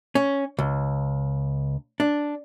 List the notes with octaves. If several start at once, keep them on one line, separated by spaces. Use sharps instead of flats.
C#4
C#2
D4